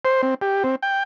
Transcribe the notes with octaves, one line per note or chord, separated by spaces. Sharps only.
C5
C4
G4
C4
G5